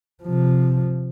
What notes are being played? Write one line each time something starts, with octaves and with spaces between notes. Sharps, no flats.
C3 F3